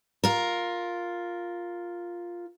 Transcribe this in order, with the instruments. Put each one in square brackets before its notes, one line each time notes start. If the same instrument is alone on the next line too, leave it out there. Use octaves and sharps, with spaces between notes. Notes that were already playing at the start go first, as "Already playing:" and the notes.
[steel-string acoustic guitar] F4 A#4